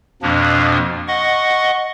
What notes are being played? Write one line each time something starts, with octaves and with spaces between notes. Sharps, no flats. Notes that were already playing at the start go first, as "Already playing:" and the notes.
F2 B2 F3 A#3 D4
D#5 F#5 C#6